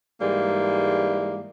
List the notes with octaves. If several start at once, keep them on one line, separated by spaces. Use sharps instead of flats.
G#2 E3 G3 G#3 A#3